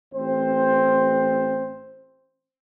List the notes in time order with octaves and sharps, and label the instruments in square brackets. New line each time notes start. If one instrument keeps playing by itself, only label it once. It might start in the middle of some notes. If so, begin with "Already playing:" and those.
[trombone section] A1 C4 C5